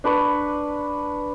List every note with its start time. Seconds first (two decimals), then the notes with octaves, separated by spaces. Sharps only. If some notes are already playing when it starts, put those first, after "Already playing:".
0.04 D4 B4 C#6